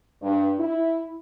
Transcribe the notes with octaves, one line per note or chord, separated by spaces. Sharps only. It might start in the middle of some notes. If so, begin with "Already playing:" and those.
G2
E4